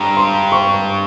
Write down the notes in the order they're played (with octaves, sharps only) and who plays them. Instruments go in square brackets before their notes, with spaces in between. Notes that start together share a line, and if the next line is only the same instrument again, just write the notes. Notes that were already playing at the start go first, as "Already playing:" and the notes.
Already playing: [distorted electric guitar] G2 [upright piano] A#5
[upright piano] C6
C#6